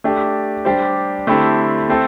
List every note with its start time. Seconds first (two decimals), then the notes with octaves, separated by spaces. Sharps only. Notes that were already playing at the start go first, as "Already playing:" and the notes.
0.04 A3 D4 G4
0.65 G3 D4 G4 C5
1.27 D3 A3 C4 E4 G4
1.89 A3 C4 A4